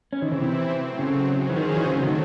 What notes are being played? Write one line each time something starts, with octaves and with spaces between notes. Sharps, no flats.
E3 C4 C#4 E4
D#3
C#3
C3
A2 F#3 C4
C#3
D#3 F#3 C#4 G#4 C5
E3
D#3
F#3
E3
C#3 F#3 A3 C4 F#4
D#3